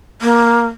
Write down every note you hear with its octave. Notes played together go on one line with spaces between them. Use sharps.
A#3